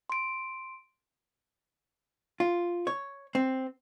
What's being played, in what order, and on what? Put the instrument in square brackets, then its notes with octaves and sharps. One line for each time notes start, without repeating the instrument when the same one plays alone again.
[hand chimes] C6 D7
[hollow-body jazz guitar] F4
C#5
C4